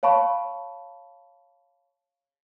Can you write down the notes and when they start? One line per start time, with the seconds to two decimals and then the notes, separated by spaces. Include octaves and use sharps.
0.03 C#5 F5 A5 B5 C#6